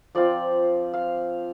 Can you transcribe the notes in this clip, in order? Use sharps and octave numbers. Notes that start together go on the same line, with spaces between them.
F3 C4 F4 D5
F5